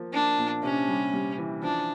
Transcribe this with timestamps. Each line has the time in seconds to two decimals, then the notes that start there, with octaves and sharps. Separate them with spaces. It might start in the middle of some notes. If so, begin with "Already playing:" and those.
Already playing: F3 A#3
0.13 A#3 D4
0.38 A#2
0.63 C3 C#4
0.88 G3
1.13 G3
1.38 E3
1.63 F3 D4